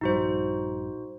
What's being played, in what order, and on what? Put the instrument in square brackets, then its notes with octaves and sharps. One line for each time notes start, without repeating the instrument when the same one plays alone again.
[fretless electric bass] A#1 G2 [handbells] D#4 F#4 C5